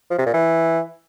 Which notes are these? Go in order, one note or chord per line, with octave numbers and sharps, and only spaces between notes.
F3
C3
A#2
E3